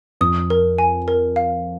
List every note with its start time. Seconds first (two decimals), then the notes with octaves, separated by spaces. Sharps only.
0.21 F2 D#6
0.50 A#4
0.78 G#5
1.08 A#4
1.36 F5